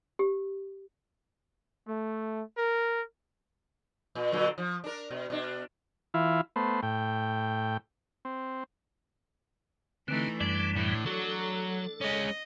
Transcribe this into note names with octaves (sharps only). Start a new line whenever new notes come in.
G4
A3
A#4
A#2
A#2 D3 F#3
F3
D4 A#4
B2
B2 D4
E3 E4 F4
A3 B3 C5
A2 G5
C4
D3 E3 A3 C4 D#4
F#2 E3 G3 D4 D5
A2
F#3 A4
G#3 C#4 D#5